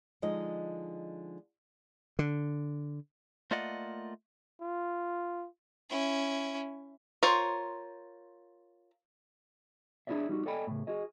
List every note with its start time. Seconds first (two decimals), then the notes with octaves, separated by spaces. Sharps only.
0.22 D3 F3 G#3 D#4 D#5
2.19 D3
3.51 A3 A#3 F4 D5 D#5 F#5
4.61 F4
5.90 C#4 E4
7.23 F4 A#4 C5 C#5
10.07 D4 E4 F#4 G#4 D5 E5
10.29 G3 D#4 F#4
10.46 A4 D5 D#5 G5 G#5 B5
10.67 A2 C#3
10.87 F#4 G#4 D#5